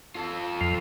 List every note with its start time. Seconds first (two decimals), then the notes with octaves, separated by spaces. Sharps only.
0.15 F4 A4
0.61 F2 F3